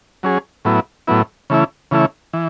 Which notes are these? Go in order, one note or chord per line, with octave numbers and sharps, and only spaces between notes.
F#3 C#4 G#4
A2 F#3 B3 E4
A2 F#3 B3 E4
C#3 E3 A3 E4
C#3 E3 A3 E4
E3